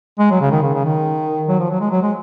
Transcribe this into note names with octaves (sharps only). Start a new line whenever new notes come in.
G#3
F#3
C#3
D#3
C#3
C#3
D#3
F#3
F3
F#3
G#3
F#3
G#3